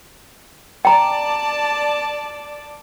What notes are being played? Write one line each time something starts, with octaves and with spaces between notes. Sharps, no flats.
D5 G5 A5 A#5